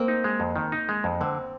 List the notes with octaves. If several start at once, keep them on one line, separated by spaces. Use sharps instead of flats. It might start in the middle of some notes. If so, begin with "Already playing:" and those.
Already playing: A#3 C4
D#4
G#3
F2
D#3
D#4
G#3
F2
D3 C4